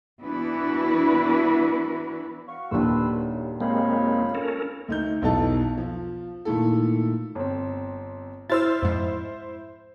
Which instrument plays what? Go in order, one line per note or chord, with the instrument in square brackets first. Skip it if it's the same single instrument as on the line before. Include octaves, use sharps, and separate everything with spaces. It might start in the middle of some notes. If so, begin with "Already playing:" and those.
[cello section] E3 B3 D4 E4 F#4 B4
[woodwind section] F#4 F5 C#6
[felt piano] D#1 D#2 D4 [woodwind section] B4 C6 E6
[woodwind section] F#2
[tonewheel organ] G#3 A#3 C4 [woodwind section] F4 C#5 B5
[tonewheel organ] C#4 A4 A#4
[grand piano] D2 D#4 G6
B1 E2 B2 D#4 A4 A5
F3
A#2 D#3 A3 E4 A4
[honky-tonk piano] G1 C4
[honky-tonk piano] E4 C5 [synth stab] E6 F6 A6
[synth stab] F2 G#2